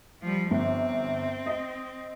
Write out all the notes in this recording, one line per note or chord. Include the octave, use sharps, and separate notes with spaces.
F3 G3
G1 C4
D#5